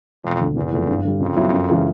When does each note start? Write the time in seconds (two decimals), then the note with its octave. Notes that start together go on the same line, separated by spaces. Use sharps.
0.24 E1 F2
0.41 D2 D3
0.56 F#1 E2
0.72 F2 C3 F3 A3
0.88 G2
1.05 D3 G3
1.20 F2 C#3
1.36 F#3 B3 E4
1.52 F#2
1.69 C#3 E3 G#3